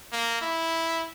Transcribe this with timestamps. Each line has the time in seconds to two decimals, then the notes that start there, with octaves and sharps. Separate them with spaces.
0.12 A#3
0.41 E4